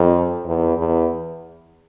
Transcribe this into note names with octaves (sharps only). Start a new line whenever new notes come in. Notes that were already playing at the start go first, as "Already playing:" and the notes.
Already playing: F2
E2
E2